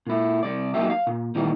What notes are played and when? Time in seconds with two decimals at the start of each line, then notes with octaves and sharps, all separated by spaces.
0.07 A#2 E4
0.43 C2 D5
0.74 F#3 A#3 D4 D#4 G4 E5
0.90 F5
1.07 A#2
1.35 A#2 D#3 E3 G3